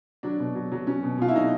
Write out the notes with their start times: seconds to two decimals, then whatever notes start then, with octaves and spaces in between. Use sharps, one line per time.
0.23 F#3 D4
0.39 B2
0.55 F#3
0.72 F#3
0.87 F#3 C#4
1.03 B2
1.18 B2 F4
1.29 E4
1.34 F#3 D#4